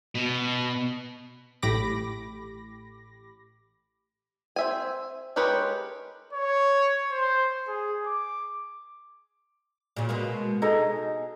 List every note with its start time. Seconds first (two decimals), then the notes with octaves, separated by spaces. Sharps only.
0.15 B2
1.62 A1 A2 G4 B5 D6 A#6
4.56 C4 E5 G#5
5.36 G#3 G4 A#4 B4 C#5
6.33 C#5
7.11 C5
7.67 G#4
8.06 D6
9.97 A#2 C#3
10.09 B2 G#3 A#3
10.62 B2 D#4 G#4 A4 D#5 A#5